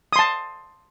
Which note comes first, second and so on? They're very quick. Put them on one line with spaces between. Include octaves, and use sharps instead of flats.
D#6 C6 A5